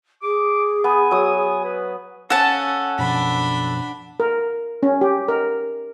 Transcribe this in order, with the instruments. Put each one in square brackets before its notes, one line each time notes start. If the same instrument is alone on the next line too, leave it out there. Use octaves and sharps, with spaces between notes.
[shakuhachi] G#4 [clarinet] D6
[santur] B3 [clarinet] G#5
[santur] F#3 D#6
[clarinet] B4
[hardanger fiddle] C#4 [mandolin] A4 A5 [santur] F#5
[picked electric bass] F#2 B2 F3 [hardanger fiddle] D4 B5
[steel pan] A#4
C#4
G4
A#4